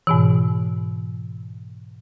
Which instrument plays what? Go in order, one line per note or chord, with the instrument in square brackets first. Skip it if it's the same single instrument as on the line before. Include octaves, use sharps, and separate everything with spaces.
[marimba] G#2 B2 E3